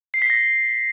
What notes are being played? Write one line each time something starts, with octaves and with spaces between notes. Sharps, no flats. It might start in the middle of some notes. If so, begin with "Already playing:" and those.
C7
B6
A#6